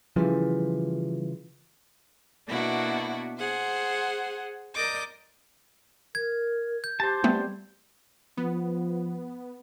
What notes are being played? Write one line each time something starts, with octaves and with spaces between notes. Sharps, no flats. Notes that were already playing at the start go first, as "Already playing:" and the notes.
C#3 E3 F3 G3 F4
B2 A#3 B3 D4 E4 F#4
G#4 C5 F#5
A#4 D5 D#5 D6 G6
A#4 G#6
G6
G4 C5 A5
G3 A3 B3 C4
F3 B3